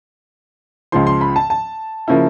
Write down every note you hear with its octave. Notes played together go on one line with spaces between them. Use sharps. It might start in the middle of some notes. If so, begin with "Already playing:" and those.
C#2 C#3 F3 C6
C6
B5
A5
A5
C#3 F3 A#3 C#4 E4